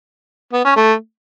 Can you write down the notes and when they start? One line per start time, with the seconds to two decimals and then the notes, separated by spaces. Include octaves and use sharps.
0.53 B3
0.65 C#4
0.76 A3